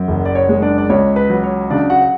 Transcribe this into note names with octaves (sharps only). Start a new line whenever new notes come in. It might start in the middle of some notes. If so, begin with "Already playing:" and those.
Already playing: F#2
F#1
D5
C#5
G#3
D4 D5
D5
C#2 C#5
B4
F#3
C#5
C#3 D4 D5
F#4 F#5
F#5